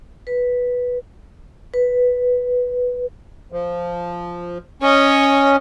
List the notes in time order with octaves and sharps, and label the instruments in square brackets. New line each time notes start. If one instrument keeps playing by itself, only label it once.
[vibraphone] B4
B4
[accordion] F3
[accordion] C#4 [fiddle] C#5 D#5